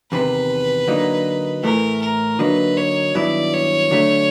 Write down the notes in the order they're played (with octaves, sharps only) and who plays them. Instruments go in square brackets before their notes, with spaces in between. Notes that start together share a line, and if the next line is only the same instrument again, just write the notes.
[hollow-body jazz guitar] E2 C3 D#3 [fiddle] B4
[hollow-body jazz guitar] D3 F#3 A#3 D#4
[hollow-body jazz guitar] A2 E3 A3 [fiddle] A#4
[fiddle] A#4
[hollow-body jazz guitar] D3 F#3 A#3 D#4 [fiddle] B4
[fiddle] C#5
[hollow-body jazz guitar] G2 D#3 F#3 B3 E4 [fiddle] D5
[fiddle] C#5
[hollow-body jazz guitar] D3 F#3 A3